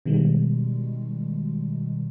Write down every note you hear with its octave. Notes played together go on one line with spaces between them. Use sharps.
B2 D#3 G3 G#3